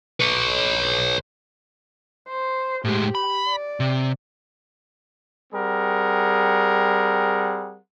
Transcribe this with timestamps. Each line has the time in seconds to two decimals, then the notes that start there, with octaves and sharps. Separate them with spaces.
0.20 B4 C#5
2.28 C5
2.85 A2 G#3 G4
3.15 B5
3.49 D5
3.80 C3
5.53 G3 C4 G#4 A#4 F#5